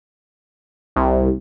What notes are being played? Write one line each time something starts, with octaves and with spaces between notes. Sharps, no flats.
C2